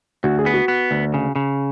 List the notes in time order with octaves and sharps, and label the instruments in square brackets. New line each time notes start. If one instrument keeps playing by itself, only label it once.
[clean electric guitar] D2 [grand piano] F#4
[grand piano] G#4
[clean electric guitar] B3
[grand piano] F#4
[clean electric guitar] B3
D2
C#3
C#3